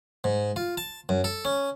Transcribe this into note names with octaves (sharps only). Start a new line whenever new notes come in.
G#2
F4
A5
F#2
A4
C#4